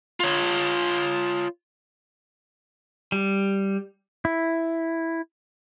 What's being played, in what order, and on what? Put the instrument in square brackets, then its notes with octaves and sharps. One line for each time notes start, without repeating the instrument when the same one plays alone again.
[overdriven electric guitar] F4 C#5
[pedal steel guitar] G3
E4